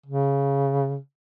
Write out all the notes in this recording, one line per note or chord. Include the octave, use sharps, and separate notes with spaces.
C#3